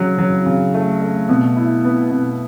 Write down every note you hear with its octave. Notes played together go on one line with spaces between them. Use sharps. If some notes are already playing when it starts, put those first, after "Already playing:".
Already playing: C#3 F#3
F#3
C#3
A3
A3
B2
E4
B3
B2